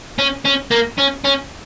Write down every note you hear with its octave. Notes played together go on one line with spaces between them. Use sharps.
C#4
C#4
A#3
C#4
C#4